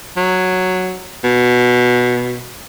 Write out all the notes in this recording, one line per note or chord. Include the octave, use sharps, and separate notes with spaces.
F#3
B2